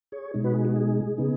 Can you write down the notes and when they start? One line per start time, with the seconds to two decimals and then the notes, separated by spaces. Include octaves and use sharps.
0.12 G#4 C#5
0.34 B2 G#3 D#4
0.44 F#4 B4
0.54 G#4
0.65 F#4
0.76 G#4
1.18 C#3 B3 D#4